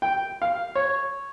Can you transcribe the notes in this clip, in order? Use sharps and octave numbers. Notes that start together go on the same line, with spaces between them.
G5
F5
C#5